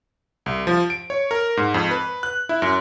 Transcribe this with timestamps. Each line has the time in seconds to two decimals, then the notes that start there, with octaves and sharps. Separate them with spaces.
0.46 C2
0.67 F3
0.90 D7
1.10 C#5
1.31 A#4
1.57 G#2
1.74 F2
1.91 B4
2.23 F#6
2.49 E4
2.62 F#2